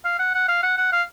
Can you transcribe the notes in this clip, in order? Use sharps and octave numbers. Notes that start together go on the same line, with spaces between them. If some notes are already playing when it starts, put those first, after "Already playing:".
F5
F#5
F#5
F5
F#5
F#5
F5